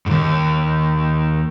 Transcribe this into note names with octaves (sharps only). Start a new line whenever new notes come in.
D#2 G#2